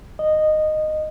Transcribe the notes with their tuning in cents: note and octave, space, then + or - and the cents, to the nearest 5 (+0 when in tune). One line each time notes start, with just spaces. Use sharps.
D#5 -10